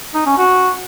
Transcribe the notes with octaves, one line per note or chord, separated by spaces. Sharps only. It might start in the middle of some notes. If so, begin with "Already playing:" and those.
D#4
C#4
F#4